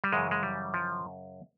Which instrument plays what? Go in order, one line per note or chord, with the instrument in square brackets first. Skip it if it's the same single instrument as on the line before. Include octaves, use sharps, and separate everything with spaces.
[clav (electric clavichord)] G3
F#2 C#3 E3 G#3
G#3
G3
F3